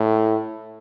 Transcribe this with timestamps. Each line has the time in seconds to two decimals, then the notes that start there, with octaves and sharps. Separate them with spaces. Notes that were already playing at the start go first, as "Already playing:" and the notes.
Already playing: A2